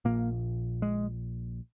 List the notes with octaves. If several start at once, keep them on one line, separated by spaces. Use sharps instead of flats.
A#1 A#2 A#3
G#3